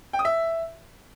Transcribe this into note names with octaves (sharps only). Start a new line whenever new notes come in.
G5
D#6
E5